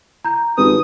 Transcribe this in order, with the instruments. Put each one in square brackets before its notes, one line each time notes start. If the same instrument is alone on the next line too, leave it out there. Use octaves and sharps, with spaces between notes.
[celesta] A#5 G6
[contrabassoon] G#1 [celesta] F4 G4 B4 [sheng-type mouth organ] D#6